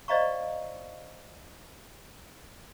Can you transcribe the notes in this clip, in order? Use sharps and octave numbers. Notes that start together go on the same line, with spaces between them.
C5 D5 D#5 F5 A#5 C#6